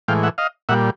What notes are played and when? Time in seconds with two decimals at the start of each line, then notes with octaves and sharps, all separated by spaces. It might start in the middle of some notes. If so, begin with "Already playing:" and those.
0.08 A2 E3 G#3 F5 G5
0.23 E5 F#5
0.38 D#5 F5
0.69 A#2 G3 E5 F#5